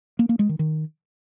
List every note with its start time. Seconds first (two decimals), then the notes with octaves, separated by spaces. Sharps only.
0.19 A#3
0.29 A#3
0.39 G#3
0.49 D#3
0.59 D#3